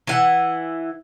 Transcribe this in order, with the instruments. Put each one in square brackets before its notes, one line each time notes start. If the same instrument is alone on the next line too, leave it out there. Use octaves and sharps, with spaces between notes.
[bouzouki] E3 F#5